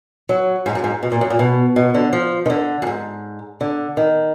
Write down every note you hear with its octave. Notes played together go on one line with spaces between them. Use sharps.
F#3
G#2
F#2
G#2
B2
A#2
F#2
A#2
B2
B2
D3
F3
D#3
D3
F#2
G#2
D3
D#3